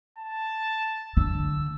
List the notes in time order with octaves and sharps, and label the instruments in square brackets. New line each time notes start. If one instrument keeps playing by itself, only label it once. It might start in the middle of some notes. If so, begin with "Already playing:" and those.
[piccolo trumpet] A5
[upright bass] D3 [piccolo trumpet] E6